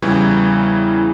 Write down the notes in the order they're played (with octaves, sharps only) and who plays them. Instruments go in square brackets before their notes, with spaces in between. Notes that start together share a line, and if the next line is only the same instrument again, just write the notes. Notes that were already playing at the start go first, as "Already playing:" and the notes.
[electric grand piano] E2 C#3 E3 G3 E4 C#6